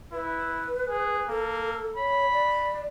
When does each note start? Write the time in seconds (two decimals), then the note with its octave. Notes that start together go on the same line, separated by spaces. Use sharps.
0.13 E4 B4
0.89 G#4
1.28 A#3 A4
1.96 C#5 B5
2.32 D5